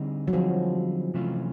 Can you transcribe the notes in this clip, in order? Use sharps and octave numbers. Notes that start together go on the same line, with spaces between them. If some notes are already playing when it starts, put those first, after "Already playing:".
Already playing: D3 G3 C4 D#4 G#4
F#3
D3 F3 G3 C4 D#4 G#4
C3 E3 A3 C#4 F4